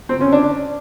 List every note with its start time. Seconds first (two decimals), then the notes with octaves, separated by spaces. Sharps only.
0.09 C4
0.21 C#4
0.32 D4